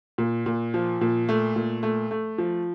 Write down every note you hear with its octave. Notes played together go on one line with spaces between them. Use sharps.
A#2
A#2
F3
A#2
A3
A#2
A3
A3
F3